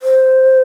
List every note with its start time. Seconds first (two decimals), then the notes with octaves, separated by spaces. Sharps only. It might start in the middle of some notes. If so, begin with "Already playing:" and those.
0.02 C5